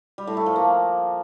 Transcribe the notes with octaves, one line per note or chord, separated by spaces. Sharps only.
G3
A2
A3
F3
A#3